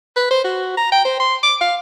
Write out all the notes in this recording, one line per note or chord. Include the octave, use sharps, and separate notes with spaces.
B4
C5
F#4
A#5
G5
C5
C6
D6
F5